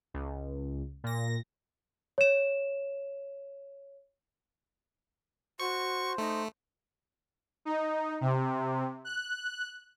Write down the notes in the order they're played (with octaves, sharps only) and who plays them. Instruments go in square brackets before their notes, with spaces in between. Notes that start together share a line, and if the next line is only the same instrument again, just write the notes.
[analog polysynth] C#2
A#2 A#6
[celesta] C#5 E7
[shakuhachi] F#4 [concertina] C5 [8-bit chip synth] C#6
[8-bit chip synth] A3 [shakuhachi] D#4
[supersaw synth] D#4
C3
F#6